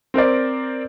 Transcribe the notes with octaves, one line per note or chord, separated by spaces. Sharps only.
C4 A#4 C5 D5